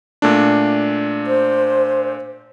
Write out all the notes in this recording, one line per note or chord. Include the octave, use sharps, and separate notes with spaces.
A#2 A3 D4
C5